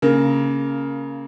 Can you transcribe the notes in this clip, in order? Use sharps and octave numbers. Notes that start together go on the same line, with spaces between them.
C#3 A#3